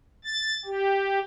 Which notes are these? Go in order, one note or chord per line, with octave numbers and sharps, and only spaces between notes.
A6
G4